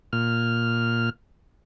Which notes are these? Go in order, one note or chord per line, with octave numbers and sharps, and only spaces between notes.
A#2 F6